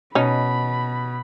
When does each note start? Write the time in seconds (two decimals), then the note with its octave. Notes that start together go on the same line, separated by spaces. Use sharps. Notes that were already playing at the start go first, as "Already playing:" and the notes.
0.15 B2 C#4 D#4 B5